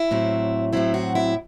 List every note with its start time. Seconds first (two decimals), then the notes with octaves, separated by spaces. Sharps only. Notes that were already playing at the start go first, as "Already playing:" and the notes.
Already playing: E4
0.11 A2 F#3 C4
0.73 A2 F#3 C4 E4
0.94 F#4
1.15 E4